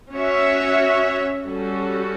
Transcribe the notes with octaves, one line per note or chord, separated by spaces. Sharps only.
C#4 F#4 C#5 E5
G3 C#4 F#4 A4